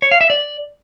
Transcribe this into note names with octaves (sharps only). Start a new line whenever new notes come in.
C#5
F5
E5
D5